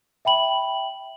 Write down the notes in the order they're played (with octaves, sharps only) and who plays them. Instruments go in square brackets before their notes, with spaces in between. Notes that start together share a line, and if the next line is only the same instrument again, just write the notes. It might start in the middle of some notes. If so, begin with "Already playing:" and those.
[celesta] E5 G5 B5 F#7